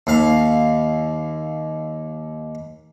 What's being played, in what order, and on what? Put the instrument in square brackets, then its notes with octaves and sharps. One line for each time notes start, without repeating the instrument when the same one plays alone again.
[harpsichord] D#2 F5